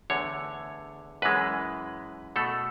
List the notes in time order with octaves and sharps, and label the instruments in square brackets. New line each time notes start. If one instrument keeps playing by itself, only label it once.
[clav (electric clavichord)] E2 D3 A3 C#5
F#2 E3 G#3 B4
B2 A3 A4